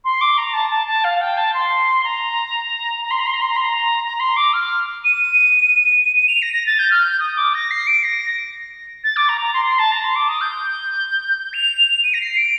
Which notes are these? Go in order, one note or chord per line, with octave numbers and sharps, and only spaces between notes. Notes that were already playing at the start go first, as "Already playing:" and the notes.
C6
D6
A#5
A5
A5
A5
F5
G5
A5
C6
A#5
A#5
C6
A#5
C6
A#5
C6
A#5
C6
A#5
A#5
C6
D6
F6
D#7
D#7
D#7
F7
A#6
A#6
A6
G6
F6
G6
D#6
D6
A#6
C7
D7
A#6
A6
D6
A#5
A#5
C6
C6
A5
A#5
C6
D6
D#6
G6
F7
D#7
A#6
C7
D7